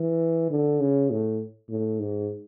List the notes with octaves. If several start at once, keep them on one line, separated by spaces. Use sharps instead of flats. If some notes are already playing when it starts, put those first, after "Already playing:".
Already playing: E3
D3
C#3
A2
A2
G#2